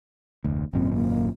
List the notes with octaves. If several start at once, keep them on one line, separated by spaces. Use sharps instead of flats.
F1 D2
G#1 F#2 A#2 C4
A#3